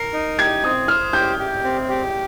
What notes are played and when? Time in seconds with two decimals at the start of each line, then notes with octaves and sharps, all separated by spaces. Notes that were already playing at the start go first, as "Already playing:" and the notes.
Already playing: A#4 C7
0.13 D#4
0.38 G4 G#6
0.64 C4 D#6
0.88 C5 F6
1.13 G4 G6
1.39 G4
1.64 C4
1.89 G4